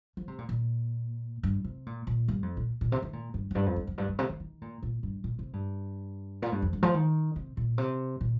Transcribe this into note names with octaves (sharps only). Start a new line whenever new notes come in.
F3
C3
A#2
A#2
G2
C3
A#2
A#2
G2
F2
A#2
A#2
C3
D#3
A#2
G2
F2
G2
F2
G2
F2
G2
G2
C3
D#3
D#3
A#2
A#2
G2
A#2
C3
G2
A#2
G2
F2
G2
F3
D#3
C3
A#2
C3
A#2